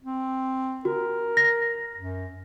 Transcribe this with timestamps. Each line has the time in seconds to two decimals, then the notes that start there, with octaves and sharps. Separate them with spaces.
0.03 C4
0.85 F#4 A#4
1.37 A#6
1.96 F#2